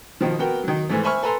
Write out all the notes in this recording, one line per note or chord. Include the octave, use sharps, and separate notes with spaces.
B2 D#3 F3
B3 F#4 A#4 G5
D#3 F#3
G#2 E3 A3
C5 E5 G#5 B5 C#6 F6
A4 B4 G#5 A#5 C6